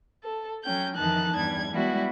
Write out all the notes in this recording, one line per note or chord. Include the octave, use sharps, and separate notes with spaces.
A4
F#3 C#4 G5 G6
F2 D#3 E3 D#4 A5 F#6
E2 G2 G3 G#6
G3 G#3 B3 E4 F#4